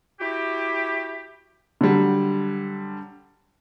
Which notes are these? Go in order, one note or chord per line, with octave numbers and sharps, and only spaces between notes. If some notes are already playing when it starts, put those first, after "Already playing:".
E4 F#4 G4
D3 F#3 G3